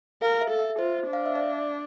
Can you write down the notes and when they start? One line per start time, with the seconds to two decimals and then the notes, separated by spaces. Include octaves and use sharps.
0.22 A#4 F5
0.41 E5
0.50 A4
0.59 E5
0.79 F4 C5
1.07 D4
1.13 F5
1.26 E5
1.35 D5